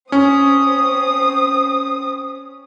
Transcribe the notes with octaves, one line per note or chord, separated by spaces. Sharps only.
C4 C#4 D#6